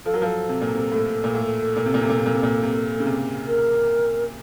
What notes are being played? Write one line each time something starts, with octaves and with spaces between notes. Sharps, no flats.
F3 A4
F#3
A#4
F3 A4
C3
A#2
C3
A2
A#2
A2
A#2
C3
A#2
C3
A#2
C3
A#2
C3
A#2
C3
C#3
C3
A#4